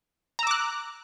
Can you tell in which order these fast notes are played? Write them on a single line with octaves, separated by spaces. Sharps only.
A#5 E6 D6 F#6